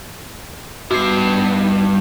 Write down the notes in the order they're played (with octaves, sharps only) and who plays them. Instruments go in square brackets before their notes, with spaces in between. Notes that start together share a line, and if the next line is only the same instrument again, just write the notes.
[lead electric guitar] G2 [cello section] B3 D#4 [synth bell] F#4 C7